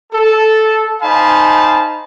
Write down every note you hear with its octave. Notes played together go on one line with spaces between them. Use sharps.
A4
D#4 C5 F5 G#5 A5 B5